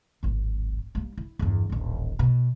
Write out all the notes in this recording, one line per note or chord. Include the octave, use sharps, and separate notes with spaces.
D1 G#1
G3 A#3
E4
G1 E2
D#1 A1
B2